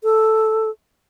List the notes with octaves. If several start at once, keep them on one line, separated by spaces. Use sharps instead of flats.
A4